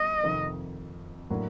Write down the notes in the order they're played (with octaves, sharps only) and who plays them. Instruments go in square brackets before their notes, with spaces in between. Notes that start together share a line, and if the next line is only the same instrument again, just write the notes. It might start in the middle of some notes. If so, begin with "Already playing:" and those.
Already playing: [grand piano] G3 [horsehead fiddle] D#5
[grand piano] F2 C3 D#3
A2 F#3 A#3 D4